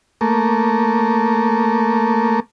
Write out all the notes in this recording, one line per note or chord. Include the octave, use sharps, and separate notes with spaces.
A3 A#3